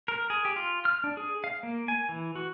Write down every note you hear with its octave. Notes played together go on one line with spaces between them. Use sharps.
A#4
G#4
G4
F4
F6
D4
G#4
F5
A#3
G#5
E3
F#4